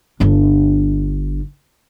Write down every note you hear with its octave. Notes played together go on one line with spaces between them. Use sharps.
G1 D4